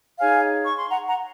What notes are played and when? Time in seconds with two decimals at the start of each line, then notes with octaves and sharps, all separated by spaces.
0.19 D#4 G#4 C#5 F5 G#5
0.64 C#6
0.76 C6
0.90 F#5 A#5
1.07 F#5 A#5